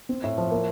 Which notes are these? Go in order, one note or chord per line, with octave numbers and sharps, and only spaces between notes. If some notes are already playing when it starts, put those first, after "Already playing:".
C4
A2
F3
A#3